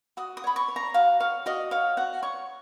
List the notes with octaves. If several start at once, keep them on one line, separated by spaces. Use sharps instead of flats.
F#4 D#6
D#6
C#5 B5
C#6
C#5
A#5
F#4 F5
C#5 F5
F#4 D#5
C#5 F5
F#4 F#5
C#5 C#6